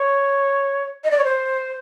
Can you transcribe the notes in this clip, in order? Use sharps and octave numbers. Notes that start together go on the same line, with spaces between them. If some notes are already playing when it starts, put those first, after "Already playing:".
Already playing: C#5
D#5
D5
C#5
C5